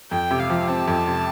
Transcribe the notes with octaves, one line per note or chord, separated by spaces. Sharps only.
F2 G5
C3
F5
F3
C4 A5
F2
C3